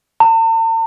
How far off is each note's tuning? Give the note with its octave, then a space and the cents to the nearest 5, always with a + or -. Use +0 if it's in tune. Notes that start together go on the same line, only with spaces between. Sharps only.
A5 +45